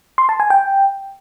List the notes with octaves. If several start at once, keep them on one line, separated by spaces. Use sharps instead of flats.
C6
A5
G#5
G5